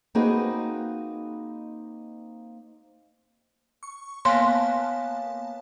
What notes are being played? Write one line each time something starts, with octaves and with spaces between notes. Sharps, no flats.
A#3 C4 D#4 F#4 G#4 B4
C#6
A#3 B3 C#5 F5 G#5 A5 C6